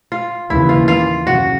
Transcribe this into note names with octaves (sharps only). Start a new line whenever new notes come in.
F4
D#2 C#3 E3 E4
F4
F4
F#2 C#3 F#4